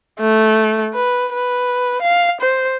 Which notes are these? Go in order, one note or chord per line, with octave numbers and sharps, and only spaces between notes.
A3
B4
B4
F5
C5